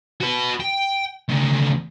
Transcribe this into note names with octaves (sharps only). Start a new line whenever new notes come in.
F#4 B4
G5
C#2 A3